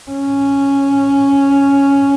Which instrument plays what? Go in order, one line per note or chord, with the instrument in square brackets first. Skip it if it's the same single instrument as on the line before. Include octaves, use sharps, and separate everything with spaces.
[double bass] C#4